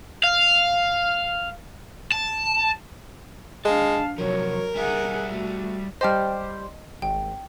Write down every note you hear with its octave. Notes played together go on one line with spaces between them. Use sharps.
F5
A5
G#3 D4 F5 A5
C3 F3 F#3 A#4 C#5
G3 G#4 E5 F#5
A3 F#4
G3 G4 C5 D#5 A5 F6
G#1 G5